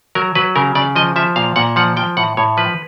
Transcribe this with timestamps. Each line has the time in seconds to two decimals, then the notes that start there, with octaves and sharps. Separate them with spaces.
0.15 F#3 A#4
0.35 F#3 B4
0.56 C#3 A#4
0.75 C#3 D5
0.96 F3 D#5
1.16 F3 E5
1.36 A#2 F5
1.56 A#2 F#5
1.76 F3 F#5
1.97 F3 G5
2.17 A2 F#5
2.37 A2 C#5
2.57 F3 B4